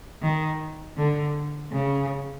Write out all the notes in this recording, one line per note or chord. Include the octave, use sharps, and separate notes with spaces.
D#3
D3
C#3